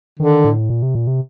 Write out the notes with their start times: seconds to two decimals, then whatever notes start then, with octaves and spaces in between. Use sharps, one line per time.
0.19 D3 D#3
0.44 A2
0.70 A#2
0.82 C3
0.95 A#2
1.07 C3